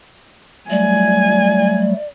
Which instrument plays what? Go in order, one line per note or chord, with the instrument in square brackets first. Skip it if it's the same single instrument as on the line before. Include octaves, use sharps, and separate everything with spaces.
[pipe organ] F#3 G3 A3 [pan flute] D5 [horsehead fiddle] G#5